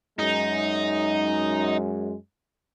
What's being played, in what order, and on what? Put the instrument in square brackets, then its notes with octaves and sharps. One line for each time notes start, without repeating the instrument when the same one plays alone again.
[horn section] F#2 G#3 [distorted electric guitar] D#4